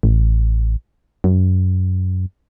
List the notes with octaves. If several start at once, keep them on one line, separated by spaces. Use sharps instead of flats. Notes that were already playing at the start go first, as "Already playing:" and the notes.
A1
F#2